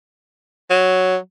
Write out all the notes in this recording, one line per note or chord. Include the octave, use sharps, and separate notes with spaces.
F#3